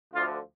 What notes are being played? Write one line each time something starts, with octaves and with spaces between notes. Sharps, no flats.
D2 D3 F3 F4